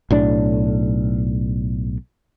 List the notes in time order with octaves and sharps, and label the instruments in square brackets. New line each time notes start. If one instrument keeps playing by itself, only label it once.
[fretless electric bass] B1 A2 D4